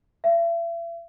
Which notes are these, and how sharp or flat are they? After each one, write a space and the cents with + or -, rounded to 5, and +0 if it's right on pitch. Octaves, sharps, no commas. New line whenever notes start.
E5 +40